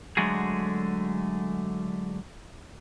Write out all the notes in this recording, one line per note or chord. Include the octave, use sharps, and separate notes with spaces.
D3 F#3 G#3 A3 F#4 G#4